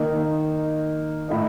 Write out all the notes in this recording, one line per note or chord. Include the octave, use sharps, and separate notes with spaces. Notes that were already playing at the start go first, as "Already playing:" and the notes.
Already playing: D#3 A#3 D#4
A2 A3 D#4